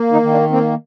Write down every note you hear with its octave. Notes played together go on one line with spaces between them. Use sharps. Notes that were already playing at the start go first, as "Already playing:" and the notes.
Already playing: A#3
D#3 D#4
D#3
D4
A#3 C4